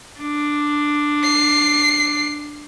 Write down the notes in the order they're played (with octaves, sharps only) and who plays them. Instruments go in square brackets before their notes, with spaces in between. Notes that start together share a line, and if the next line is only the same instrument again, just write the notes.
[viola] D4
[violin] C7